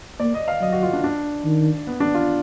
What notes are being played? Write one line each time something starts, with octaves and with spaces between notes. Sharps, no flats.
A#3 D5
D#5
F5
F#3 D#5
F#4
F4
D4
D4
D#3
B3
D4
F4